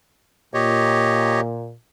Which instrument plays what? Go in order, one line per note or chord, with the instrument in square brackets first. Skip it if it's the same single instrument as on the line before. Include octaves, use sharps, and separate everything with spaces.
[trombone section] A#2 [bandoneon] G4 C#5 D#5